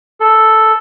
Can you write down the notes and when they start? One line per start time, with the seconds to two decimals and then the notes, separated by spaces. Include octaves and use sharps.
0.20 A4